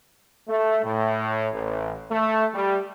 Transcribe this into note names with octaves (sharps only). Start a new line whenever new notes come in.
A3
A2
A1
A3
G3